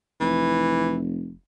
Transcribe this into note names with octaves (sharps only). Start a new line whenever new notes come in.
F1 E3